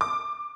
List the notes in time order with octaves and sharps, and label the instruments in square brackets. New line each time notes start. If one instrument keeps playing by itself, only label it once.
[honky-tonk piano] D6